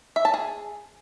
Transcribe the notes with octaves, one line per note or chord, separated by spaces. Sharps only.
E5
A5
G#4